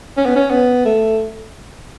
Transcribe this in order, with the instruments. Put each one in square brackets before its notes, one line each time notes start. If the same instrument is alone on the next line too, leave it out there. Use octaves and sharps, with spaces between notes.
[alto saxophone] C#4
B3
C#4
B3
A3